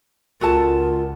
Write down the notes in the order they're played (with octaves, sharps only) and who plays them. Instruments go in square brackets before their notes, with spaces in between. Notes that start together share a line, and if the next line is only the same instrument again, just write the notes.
[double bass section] C#2 [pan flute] F4 [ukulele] F#4 A4 A5 [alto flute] A#4